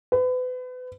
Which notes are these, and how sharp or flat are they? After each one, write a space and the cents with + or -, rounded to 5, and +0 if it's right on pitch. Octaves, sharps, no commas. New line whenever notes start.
B4 +35